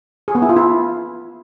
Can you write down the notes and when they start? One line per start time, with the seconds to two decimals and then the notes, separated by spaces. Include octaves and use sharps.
0.28 G#4
0.35 B3
0.42 E4
0.49 F4
0.56 E4